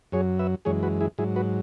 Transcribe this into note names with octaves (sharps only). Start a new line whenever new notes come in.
F#2 F#3 G#4 C#5
B4 E5
F#2 E3 G#3 G#4 C#5
F#4 B4
E4 G#4
G#2 F#3 E4 G#4
F#4 B4